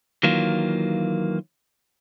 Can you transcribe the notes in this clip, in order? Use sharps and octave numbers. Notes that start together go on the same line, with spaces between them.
D#3 E3 F#3 A#3 F4